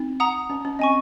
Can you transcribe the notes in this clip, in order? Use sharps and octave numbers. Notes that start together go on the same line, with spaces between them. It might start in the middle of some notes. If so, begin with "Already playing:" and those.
Already playing: C4 D#4
F#5 A#5 D#6
C#4
C#4
C4 D#5 G#5 C#6